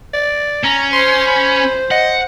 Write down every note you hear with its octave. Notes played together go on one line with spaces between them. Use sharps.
D5
C#4 A#5
C5 C6
B5
D#5 F#5